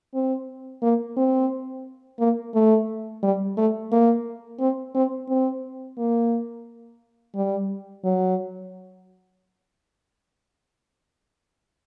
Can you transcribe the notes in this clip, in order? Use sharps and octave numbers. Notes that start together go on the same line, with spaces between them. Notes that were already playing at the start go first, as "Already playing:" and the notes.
C4
A#3
C4
A#3
A3
G3
A3
A#3
C4
C4
C4
A#3
G3
F#3